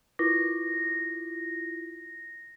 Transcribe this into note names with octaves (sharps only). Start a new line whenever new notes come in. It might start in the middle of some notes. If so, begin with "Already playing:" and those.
E4 F4 A#6